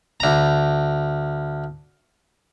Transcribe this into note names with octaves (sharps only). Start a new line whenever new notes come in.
D2 A#5